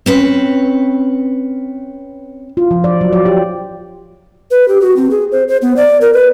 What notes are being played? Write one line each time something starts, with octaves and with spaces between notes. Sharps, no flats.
C4 C#4 B4
F4
F3
D5
F#3
D5
G4
B4
G4
F#4
C4
G#4
C5
C5
B3
D5
A#4
B4